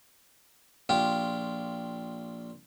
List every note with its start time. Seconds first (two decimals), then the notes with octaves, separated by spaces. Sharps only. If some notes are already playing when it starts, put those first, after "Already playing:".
0.89 A#1 F4 G4